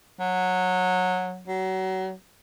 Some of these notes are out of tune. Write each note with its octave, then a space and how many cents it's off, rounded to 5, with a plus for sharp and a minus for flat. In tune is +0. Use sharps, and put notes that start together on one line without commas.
F#3 -15
F#3 +30